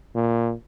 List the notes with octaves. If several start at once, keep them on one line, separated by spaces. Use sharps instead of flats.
A#2